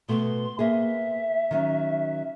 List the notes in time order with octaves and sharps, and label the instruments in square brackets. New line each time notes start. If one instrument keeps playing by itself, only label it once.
[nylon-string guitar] B2 A3 B3 [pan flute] C6
[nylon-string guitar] A#3 B3 G#4 [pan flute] E5
[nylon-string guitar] D#3 F#3 C#4